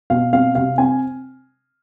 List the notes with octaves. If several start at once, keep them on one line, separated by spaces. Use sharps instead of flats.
B2 F5
C4 F5
C3 F5
C4 G#5